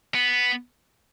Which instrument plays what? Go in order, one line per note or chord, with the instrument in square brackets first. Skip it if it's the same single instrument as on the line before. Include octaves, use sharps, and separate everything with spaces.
[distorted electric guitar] B3